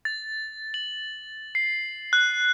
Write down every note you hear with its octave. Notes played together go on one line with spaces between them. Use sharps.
A6
F#7
C7
F#6